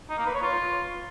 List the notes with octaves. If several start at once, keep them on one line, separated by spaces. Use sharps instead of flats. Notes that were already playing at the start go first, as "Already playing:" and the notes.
D#4
A#3
B4
C#5
F4